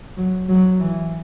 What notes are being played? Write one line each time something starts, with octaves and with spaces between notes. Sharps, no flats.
F#3
F#3
E3